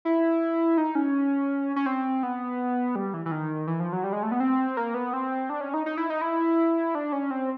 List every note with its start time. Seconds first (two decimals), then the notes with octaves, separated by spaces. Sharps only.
0.05 E4
0.77 D#4
0.95 C#4
1.76 C#4
1.86 C4
2.23 B3
2.95 G3
3.14 E3
3.26 E3
3.32 D#3
3.67 E3
3.80 F3
3.93 F#3
4.04 G3
4.13 G#3
4.23 A3
4.32 B3
4.40 C4
4.77 A#3
4.94 B3
5.13 C4
5.49 D4
5.61 C#4
5.74 D#4
5.86 D#4
5.97 E4
6.10 D#4
6.21 E4
6.95 D4
7.13 C#4
7.31 C4